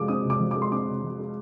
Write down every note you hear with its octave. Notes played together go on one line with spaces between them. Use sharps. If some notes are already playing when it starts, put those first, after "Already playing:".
Already playing: C3 F3 G#3 D6
C4 D#6
C3
D6
F3
G#3 D6
C6
C4 D6
C3
F3
G#3